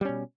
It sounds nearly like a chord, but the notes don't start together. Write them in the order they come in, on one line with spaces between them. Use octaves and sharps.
G3 C#4 B2